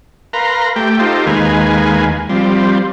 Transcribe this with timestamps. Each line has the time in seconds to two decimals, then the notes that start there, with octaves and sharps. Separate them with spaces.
0.33 A#4 B4 F5 A#5 C6
0.76 A3 G4 G5
0.99 D#4 F4 G4 A4 C5
1.26 D#2 D#3 G#3 B4 F5 G#5
2.30 F3 G3 C4